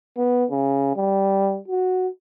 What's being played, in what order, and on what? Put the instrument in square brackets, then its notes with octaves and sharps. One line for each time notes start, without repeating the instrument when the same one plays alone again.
[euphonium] B3
C#3
G3
F#4